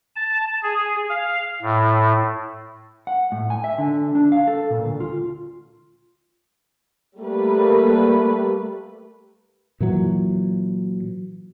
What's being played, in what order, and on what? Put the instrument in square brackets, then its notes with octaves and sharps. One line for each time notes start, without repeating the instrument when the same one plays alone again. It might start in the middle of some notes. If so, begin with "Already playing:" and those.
[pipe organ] A5
G#4
F5
A2
[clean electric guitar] F#5
A2
G#5
E5
D3
D4
F5
A4
A#2
D2
F4
[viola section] G3 A3 A#3 B4
[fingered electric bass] A#2 E3 F#3